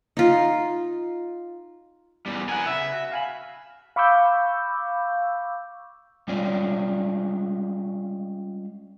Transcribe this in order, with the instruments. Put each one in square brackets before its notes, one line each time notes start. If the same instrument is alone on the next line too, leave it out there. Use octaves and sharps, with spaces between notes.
[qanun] D#4 F4
[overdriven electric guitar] E2 G3
[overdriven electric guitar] B3 G#5 [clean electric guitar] A#4 F#5
[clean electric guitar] C#3 B4 [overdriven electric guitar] E5
[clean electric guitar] F#4
F5 G#5 B5
[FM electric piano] F5 B5 C#6 D6 E6 G6
[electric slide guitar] G3 G#3 C#4 F4 C#5 D5